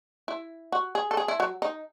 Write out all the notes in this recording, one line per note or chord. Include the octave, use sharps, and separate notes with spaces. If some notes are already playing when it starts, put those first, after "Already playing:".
E4
F#4
G#4
A4
G#4
E4
F#3
D#4